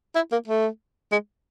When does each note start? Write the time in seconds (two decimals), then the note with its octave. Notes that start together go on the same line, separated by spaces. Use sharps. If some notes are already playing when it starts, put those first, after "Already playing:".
0.16 E4
0.32 A#3
0.48 A3
1.12 G#3